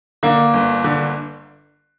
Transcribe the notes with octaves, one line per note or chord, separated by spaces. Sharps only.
D3 A#3
G1
D3